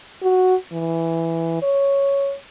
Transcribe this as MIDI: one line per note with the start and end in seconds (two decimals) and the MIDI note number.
0.23 0.56 66
0.73 1.58 52
1.62 2.35 73